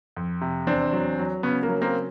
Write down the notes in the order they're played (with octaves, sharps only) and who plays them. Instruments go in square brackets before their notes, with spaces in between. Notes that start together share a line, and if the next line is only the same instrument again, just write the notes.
[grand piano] F2
C3
E2 C4 D4
F#3
F#3
C#3 B3 C#4
A#3
F#3
A#3 C4